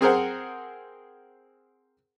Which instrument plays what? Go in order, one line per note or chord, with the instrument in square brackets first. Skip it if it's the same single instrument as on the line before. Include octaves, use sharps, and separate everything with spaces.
[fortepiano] C4 G#4 A#4 C5 F#5